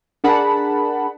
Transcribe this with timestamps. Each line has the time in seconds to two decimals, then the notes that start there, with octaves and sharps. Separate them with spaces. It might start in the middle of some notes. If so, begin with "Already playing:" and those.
0.24 D4 G#4 A#4 F#5 A5 B5